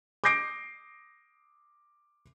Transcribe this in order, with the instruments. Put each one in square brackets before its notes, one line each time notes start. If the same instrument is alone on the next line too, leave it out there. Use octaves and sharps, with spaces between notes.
[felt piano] D6 D#6 G6 A#6 C7 D7